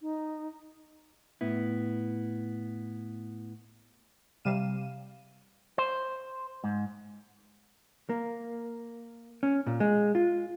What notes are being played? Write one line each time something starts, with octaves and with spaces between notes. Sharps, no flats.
D#4
A2 B3 E4
C3 G3 F5 D#7 E7
C5
G#2
A#3
C#4
A#2
G#3
F4